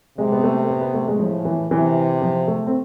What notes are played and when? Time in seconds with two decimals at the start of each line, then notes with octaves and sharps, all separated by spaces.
0.18 C3 G#3
0.32 B3
0.43 A3
0.70 B3
0.81 B3
0.94 A3
1.08 G#3
1.20 A2 F3
1.45 E3
1.71 C3 E3
2.22 F3
2.47 A3
2.67 C4